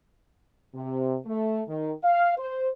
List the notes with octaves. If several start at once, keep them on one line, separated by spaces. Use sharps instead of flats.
C3
A3
D#3
F5
C5